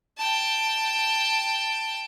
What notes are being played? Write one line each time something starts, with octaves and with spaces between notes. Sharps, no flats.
G5 A5